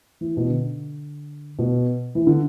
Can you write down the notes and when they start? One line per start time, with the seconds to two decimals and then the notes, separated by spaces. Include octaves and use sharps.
0.21 E3
0.37 B2
0.49 D3
1.59 B2
2.15 E3
2.27 D3